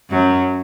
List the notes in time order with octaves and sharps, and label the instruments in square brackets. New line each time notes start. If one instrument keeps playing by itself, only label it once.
[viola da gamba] F#2 F#3